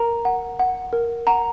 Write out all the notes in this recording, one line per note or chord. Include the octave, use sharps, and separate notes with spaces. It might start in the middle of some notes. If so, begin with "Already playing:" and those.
Already playing: A#4 A#5
F#5
F#5
A#4
F#5 A#5